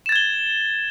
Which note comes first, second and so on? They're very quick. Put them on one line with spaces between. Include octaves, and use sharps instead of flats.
E7 A6 G#6 G7